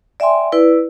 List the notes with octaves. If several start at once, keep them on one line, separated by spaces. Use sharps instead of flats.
D5 E5 G5 G#5 C6
E4 B4 D5